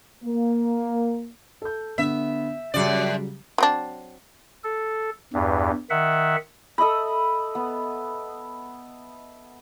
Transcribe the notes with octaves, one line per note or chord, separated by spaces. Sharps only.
A#3
A4 G6
D3 B3 E5
F#2 C#3 F#3 G3 D5
F#3 C4 D4
A4
E2 G2
D#3 E5 F#5
A4 D#5 E5 B5
B3